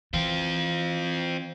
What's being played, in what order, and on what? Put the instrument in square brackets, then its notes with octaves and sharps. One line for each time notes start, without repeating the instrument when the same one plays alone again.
[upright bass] E3 [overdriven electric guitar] C4 F4